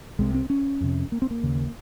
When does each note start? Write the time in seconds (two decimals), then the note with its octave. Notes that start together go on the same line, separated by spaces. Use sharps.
0.19 C2 C3 G#3
0.34 C4
0.50 C#4
0.81 F2 C3
1.12 A#3
1.22 C4
1.31 A#3
1.43 D#2 C#3